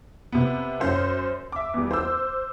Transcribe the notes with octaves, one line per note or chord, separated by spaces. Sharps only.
C3 B3
F#2 C#4 C5
E5 D6
E2 G3
C5 E6